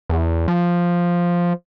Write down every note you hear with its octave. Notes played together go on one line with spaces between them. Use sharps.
E2
F3